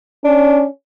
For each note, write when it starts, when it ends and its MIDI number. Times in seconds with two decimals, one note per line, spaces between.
0.24 0.67 61
0.24 0.64 62